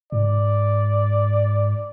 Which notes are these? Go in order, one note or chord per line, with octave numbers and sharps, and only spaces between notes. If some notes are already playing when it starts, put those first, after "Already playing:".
G#2 D5